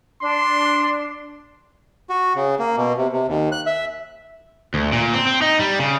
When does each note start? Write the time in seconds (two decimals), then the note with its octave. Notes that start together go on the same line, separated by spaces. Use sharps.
0.21 D4 C6
2.10 F#4
2.35 C#3
2.59 A#3
2.77 B2
2.97 C3
3.12 C3
3.27 D#2
3.52 F#6
3.66 E5
4.74 D2
4.92 A#2
5.14 C4
5.27 C4
5.42 D#4
5.59 G3
5.80 C#3